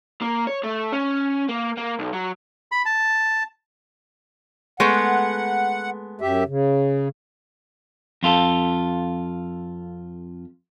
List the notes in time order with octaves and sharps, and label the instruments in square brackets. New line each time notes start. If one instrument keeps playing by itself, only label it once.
[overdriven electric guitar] A#3
C#5
A3
C#4
A#3
A#3
B1
F#3
[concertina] B5
A5
[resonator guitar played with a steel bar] G#3 A3 B3 [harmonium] F#5
[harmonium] F#2 G4 E5
C#3
[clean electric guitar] F2 F4 A4